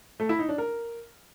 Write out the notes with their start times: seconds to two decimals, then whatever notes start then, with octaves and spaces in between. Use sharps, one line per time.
0.20 A3
0.29 E4
0.39 D#4
0.49 D4
0.58 A#4